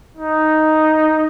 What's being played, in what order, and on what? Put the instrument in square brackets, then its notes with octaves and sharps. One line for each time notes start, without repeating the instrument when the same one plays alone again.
[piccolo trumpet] D#4